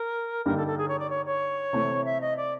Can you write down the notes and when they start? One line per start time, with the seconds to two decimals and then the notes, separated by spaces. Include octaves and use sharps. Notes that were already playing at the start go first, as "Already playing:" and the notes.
Already playing: A#4
0.45 G2 D3 G3 A#3 D#4 A#4
0.57 A4
0.67 A4
0.78 G#4
0.88 C#5
0.99 D5
1.10 C#5
1.25 C#5
1.73 C3 E3 A3
2.05 E5
2.21 D#5
2.37 D5